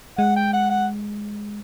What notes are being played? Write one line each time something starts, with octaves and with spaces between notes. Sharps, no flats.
G#3 F#5
G5
F#5
F#5